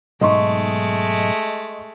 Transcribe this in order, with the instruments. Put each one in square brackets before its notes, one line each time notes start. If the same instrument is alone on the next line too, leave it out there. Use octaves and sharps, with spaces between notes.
[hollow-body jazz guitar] B1 G#2 [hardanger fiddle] G#3 A3 [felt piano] D#5 C6 C#6